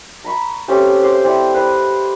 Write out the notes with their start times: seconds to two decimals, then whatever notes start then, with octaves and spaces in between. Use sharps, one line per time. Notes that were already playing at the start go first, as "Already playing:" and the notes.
0.24 A#5 B5 C#6
0.68 A3 C4 C#4 G4
1.03 C5 D6
1.24 C4 E4 D5
1.54 B4 C5 D#5